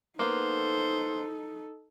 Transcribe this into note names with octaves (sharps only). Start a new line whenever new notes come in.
A#3 B3 D#4 A4 C5